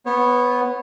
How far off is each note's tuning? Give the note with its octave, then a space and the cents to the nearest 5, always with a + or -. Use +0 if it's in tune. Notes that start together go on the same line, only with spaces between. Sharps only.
B3 +0 C#5 -25